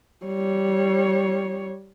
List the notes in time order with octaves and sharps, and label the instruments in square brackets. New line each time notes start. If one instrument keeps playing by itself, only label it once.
[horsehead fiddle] G3 C#5